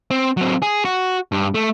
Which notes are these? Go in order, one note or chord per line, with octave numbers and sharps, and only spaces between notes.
C4
F#3 C4
G#4
F#4
G2
A3